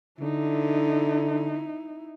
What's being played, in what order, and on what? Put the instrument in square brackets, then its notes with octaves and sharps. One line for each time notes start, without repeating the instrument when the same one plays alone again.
[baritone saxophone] D3 [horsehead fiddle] D#4 E4